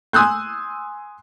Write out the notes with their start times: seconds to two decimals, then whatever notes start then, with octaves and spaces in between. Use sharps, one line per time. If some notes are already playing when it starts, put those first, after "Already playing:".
0.13 G#5 C6 D#6 E6 F#6 G6